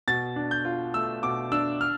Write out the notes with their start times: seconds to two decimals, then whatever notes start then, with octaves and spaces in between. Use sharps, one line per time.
0.08 B2 A6
0.36 D4
0.51 G6
0.65 F4
0.94 A3 E6
1.23 B2 D6
1.52 D4 E6
1.81 F6